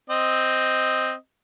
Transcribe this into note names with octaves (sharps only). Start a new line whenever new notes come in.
C4 D#5